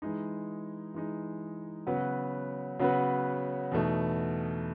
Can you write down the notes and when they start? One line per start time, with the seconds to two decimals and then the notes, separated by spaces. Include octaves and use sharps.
0.02 E3 G#3 D#4
0.94 E3 G#3 D#4
1.87 C#3 F#3 B3 F#4 B4
2.79 C#3 F#3 B3 F#4 B4
3.72 E2 B2 A3 D#4